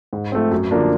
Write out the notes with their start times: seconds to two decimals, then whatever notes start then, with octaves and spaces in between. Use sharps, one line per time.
0.13 G#2
0.32 F3 A3 C4
0.51 F#2
0.71 D3 F3 A#3 D4